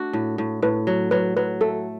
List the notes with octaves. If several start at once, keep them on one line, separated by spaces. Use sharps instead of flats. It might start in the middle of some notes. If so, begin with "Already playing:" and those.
Already playing: A3 D4 F#4
A2
A2
A2 B4
F#3
F#3 B4
F#3 B4
A3 A4